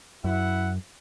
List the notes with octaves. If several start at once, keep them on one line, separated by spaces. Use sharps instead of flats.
F#2 E4 E5 F#5